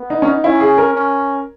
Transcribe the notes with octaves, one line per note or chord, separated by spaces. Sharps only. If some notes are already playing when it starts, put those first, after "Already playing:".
Already playing: B3
D#4
C#4
D#4
C#4 E4
G#4
A#4
C#4